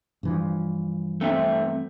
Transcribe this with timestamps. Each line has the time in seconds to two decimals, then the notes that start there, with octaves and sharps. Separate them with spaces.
0.23 G2 E3 F3
1.21 A3 C4 E5